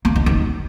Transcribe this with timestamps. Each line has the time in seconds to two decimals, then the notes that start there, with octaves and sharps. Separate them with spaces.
0.05 A#3
0.16 D#4
0.26 D#4